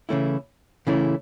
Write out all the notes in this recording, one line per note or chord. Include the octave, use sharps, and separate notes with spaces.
C#3 E3 A3 C#4 E4
C#3 E3 A3 C#4 E4